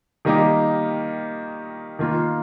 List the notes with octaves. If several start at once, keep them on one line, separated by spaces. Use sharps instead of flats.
D#3 G3 A#3 D#4 G4
D#3 A#3 F4